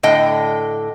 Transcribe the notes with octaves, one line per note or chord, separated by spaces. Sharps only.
A2 D3 D#5 G5